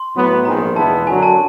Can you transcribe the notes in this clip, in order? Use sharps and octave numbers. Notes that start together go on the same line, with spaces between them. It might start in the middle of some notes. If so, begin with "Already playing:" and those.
Already playing: C6
A2 F#3 B3
A#1 G#2 D#3 G#3 A#5
E2 B2 G#3 B3 E4 A5
F#2 D3 F#3 G#5
A5